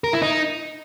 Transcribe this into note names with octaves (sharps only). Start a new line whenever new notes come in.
A#4
E4
D#4